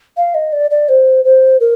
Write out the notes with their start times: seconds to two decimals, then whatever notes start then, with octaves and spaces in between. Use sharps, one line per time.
0.17 F5
0.34 D#5
0.52 D5
0.70 D5
0.89 C5
1.24 C5
1.60 A#4